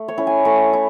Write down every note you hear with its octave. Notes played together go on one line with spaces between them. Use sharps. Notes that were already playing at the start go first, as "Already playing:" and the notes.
Already playing: A3
C#5
C#4 E4
G#5
A3 C#6
E4